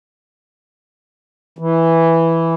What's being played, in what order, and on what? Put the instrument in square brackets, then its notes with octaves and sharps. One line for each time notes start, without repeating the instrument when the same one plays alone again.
[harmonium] E3